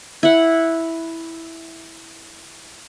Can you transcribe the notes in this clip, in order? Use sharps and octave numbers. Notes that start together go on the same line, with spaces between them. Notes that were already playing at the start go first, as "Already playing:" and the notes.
E4 F#5